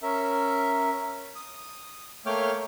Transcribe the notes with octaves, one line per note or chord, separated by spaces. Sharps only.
C#4 A#4 E5
D#6
A3 A#3 C#5 G5 D6 F6